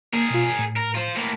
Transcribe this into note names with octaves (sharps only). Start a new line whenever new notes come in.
A#3 G#4 A#4
B2 F4
A2
A#4
F4 C5
A2 A#3